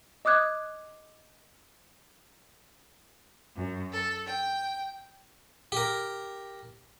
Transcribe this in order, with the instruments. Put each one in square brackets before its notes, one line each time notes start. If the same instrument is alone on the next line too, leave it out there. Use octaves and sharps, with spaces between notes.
[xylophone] D#5 D6 D#6 F#6 G#6
[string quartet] F#2
A4
G5
[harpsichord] G4 A#4